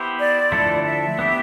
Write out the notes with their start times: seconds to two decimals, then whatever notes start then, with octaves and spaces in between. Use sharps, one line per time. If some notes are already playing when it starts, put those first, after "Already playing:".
Already playing: B3 E4 G4 C5
0.20 D5
0.52 D3 F3 A3 E4 A4
0.86 E5
1.19 B3 E4 G4